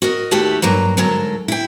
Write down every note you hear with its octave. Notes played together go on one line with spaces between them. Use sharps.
F#4 A#4 D#5
D#2 A3 F#4 G4 E5 A5
G2 F#3 A#3 A#5
D2 G#2 F#3 A4 A#4 A#5
E4 G5